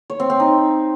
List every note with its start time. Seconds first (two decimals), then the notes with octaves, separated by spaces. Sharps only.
0.10 C#5
0.20 C4
0.30 C4
0.40 D#4